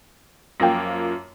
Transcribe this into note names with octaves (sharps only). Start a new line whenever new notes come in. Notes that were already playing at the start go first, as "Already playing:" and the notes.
F#2 F3 A#3 G5 A#6